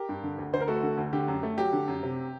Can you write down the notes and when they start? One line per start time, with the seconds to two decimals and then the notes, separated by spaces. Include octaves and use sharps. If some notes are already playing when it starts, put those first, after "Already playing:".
Already playing: G4 A#4
0.09 G2
0.23 D3
0.38 D2
0.53 D2 C5
0.61 A#4
0.68 A3 F#4 A4
0.83 D3
0.97 D2
1.13 D3 G4
1.28 F#2
1.43 A3
1.58 F#3 G4
1.73 D3
1.88 F#2
2.03 C3